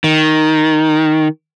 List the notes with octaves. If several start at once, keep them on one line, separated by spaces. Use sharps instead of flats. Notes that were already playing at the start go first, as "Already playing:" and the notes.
D#3